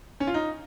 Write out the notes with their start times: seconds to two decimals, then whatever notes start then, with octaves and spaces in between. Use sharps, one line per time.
0.20 C#4
0.27 F4
0.34 D#4